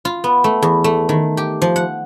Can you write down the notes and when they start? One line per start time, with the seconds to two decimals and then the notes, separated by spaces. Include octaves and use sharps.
0.05 F4
0.24 B3
0.44 A3
0.62 E2
0.84 A3
1.09 D#3
1.37 G4
1.62 F3
1.76 F#5